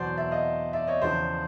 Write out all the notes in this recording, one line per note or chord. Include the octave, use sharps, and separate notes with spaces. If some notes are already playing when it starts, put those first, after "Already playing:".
Already playing: E2 B2 F#3 C5 D5
D5 E5
D#5 F5
D5 E5
C#5 D#5
E2 C#3 F3 C5 D5